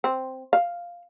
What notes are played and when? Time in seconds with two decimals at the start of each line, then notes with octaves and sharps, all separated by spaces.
0.04 C4
0.53 F5